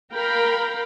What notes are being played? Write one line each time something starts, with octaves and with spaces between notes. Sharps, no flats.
A#4 F5 G5 A#5 B5